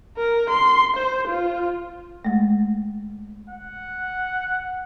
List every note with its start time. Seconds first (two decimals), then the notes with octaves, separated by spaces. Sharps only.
0.18 A#4
0.50 C6
0.97 C5
1.28 F4
2.25 G#3 A3
3.50 F#5